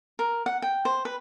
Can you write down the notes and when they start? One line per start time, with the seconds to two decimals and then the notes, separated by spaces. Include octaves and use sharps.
0.19 A#4
0.46 F#5
0.62 G5
0.85 C5
1.05 B4